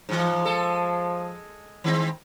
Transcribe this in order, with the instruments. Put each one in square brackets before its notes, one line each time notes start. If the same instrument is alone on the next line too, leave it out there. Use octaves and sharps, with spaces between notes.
[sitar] G#2 E3 [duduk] F3
[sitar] G#3 A4
D#3 G#3 C4